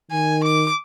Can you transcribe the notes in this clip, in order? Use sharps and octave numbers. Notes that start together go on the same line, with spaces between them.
D#3 G#5
D6